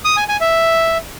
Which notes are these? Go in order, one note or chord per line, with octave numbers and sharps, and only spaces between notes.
D#6
G#5
G#5
E5